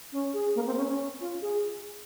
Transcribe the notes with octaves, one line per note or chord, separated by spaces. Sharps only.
C#4
G#4
A#3
C4
C#4
C#4
F4
G#4